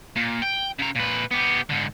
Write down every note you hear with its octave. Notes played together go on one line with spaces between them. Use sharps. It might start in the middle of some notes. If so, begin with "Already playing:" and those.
A#2
G5
C#3 A#5
A#2 B4
B3 G4
G#2 D3